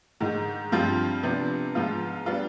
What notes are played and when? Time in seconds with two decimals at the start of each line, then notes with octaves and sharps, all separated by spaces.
0.20 G#2 D#3 G#3
0.72 G2 F3 C4 F4
1.23 C3 F3 B3 D4
1.75 G#2 F3 B3 F4
2.26 G3 B3 D4 F4